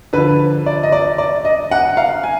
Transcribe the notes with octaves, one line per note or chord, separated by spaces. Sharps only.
D3 F3 B4
D5
D#5
D5
D5
D#5
F#5
F5
G#5